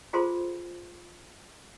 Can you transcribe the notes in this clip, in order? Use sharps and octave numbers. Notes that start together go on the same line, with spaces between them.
F4 G#4 A4 C5 A#5 C6